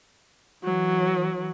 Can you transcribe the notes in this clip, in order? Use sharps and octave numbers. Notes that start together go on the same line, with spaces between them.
E3 F#3